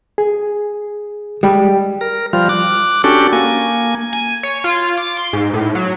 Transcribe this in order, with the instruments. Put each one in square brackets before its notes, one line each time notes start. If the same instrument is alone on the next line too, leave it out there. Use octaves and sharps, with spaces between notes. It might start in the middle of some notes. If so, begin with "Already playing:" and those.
[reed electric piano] G#4
[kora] G3 [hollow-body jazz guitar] G#3
[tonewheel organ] A#4
F3 G3 F4
D6 F#6
C#4 D4 F#4 G4 A4
A#3 G#5
[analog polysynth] G#5
C#5
F4
D6
C6
G#2
A2
F#3